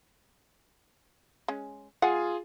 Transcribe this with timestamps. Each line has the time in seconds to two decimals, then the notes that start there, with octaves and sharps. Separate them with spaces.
1.48 G#3 C#4
2.02 G#3 F4 G#4 F#5 G#5